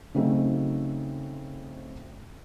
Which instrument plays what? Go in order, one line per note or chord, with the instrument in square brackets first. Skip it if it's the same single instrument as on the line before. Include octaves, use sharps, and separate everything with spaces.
[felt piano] C#3 F#3 A3 C4 D#4